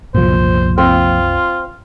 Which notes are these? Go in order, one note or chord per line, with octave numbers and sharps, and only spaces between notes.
F#1 C2 A#2 F3 C5
C4 F4